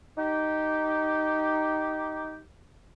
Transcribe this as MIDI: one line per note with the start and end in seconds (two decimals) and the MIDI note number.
0.18 2.39 63
0.18 2.39 67